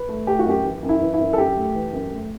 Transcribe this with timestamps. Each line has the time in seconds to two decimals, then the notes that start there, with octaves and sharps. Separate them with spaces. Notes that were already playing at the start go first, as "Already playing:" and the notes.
Already playing: B4
0.09 A3
0.27 A3 G4
0.39 F#4
0.46 F#2 G4
0.64 E3
0.83 F#2
0.89 E4
1.01 E3
1.14 E4
1.19 F#2
1.33 A4
1.38 F#2 G4
1.57 A3
1.75 E3
1.93 F#2
2.11 A3